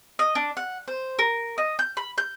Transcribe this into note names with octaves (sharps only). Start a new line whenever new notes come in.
D#5
D4
F#5
C5
A#4
D#5
G6
B5
G6